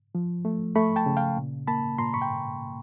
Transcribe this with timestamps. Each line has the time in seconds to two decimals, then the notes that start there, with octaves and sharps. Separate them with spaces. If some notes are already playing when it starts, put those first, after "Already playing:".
0.15 F3
0.45 A3
0.75 A3 B5 C#6
0.96 G5 A5
1.06 C#3
1.17 F5 G5
1.37 A#2
1.68 A#3 A5 B5
1.98 A#2 A#5 C6
2.14 B5 C#6
2.22 G5